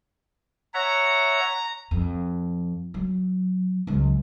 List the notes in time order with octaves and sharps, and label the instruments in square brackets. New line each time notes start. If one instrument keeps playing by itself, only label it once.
[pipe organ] C#5 E5 F#5 [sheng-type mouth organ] A#5
[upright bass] F2
F#3
C#2 F#3